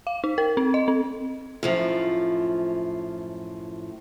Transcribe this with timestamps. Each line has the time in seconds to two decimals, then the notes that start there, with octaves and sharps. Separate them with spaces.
0.07 F5
0.24 D#4
0.38 A#4
0.57 C4
0.74 D#5
0.88 C4
1.63 F#2 A2 F3